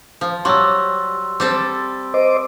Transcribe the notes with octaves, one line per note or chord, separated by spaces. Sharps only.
F3
F#3 G3 C6 E6
G3 C4 A4
C5 D#5 D6